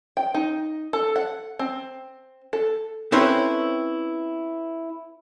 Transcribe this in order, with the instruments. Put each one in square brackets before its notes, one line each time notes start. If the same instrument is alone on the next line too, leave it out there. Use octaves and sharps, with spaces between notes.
[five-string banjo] G5
D#4
A4
F#5
C4
A4
[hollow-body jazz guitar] C4 C#4 E4 A4 B4 C5